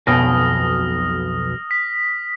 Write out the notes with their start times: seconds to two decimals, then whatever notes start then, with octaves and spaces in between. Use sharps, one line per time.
0.07 B1 F2 B2 D#6 F6 A#6
1.71 B6